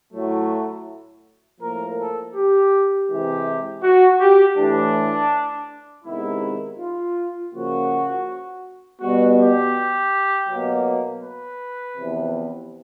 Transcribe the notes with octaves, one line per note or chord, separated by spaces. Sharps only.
A2 F#3 A3
A2 F3 A#3 A#4
A4
G4
C3 E3 G#3 G4
F#4
G4
A2 E3 A3 D4
C3 D#3 G#3 B3 E4
F4
C#3 F3 A#3 F#4
B2 G3 B3 F#4
G4
B2 F#3 A#3
B4
E2 C3 F3